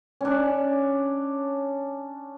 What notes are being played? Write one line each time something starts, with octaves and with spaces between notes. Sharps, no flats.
C#4 D4